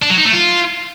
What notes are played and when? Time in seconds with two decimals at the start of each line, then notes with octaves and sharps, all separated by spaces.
0.02 D4
0.10 F#3
0.17 D#4
0.25 A3
0.33 F4